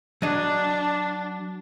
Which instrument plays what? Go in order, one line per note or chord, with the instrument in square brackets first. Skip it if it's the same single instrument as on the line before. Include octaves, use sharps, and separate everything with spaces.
[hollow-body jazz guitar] F#3 D#5 [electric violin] D4